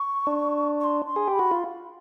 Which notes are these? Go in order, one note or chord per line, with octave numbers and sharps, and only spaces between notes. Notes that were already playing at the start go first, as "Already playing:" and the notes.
Already playing: C#6
D4
C#6
C6
C6
G#4
G4
B5
F#4
F4